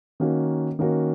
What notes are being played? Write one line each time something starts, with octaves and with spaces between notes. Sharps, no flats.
D#3 A#3 C#4 F#4 A#4
D#3 A#3 C#4 F#4 A#4